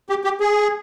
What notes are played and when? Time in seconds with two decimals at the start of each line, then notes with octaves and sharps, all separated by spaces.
0.09 G4
0.24 G4
0.40 G#4